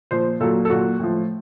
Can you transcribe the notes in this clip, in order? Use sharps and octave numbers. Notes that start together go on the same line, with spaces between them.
A#2 F3 C5
A#2 F#3 A4
A4
A#2 F#3 F#4
A2 F3